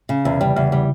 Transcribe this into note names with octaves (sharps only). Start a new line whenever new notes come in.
C#3
E2 C3
C#3 G3
E2 C#3
C#3 G3